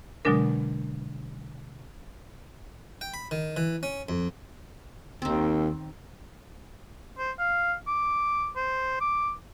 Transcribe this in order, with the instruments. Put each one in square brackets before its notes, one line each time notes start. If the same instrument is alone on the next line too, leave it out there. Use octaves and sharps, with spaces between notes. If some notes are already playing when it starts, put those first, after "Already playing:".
[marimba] B2 D3 F#3 G#3 D4 A#4
[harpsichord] G5
B5
D#3
E3
C#4
F2
[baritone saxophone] D#2 [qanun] D#3 C4
[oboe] C5
F5
D6
C5
D6